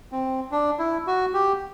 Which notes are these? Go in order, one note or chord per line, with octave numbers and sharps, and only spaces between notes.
C4
D4
E4
F#4
G4